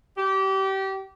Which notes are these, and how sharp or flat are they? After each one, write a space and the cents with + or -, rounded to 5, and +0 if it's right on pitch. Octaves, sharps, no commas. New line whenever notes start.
G4 -25